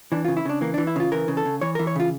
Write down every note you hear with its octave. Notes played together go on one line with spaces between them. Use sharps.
E3 D4
C#3 F4
E4
C#3 D4
E3 A#3
D4
E3
E4
C#3 F4
E3 A#4
C#3
A4
C#3
E3 C#5
A#4
E3
C#5
C#3 F4